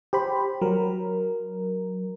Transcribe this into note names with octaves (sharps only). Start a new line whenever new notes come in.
G4 C5 B5
F#3 A#4